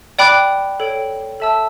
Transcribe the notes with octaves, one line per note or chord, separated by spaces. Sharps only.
D5 G5 B5 D6 F#6
A4 C#5 G5
A4 E5 A5 E6